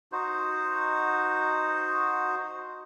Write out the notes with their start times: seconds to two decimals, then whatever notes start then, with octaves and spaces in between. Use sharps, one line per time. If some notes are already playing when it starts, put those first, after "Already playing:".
0.12 D#4 F#4 C5